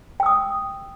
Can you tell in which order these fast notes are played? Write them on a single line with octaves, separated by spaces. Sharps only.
G5 E6 D#6